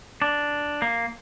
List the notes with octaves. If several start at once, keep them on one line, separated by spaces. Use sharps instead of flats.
D4
A#3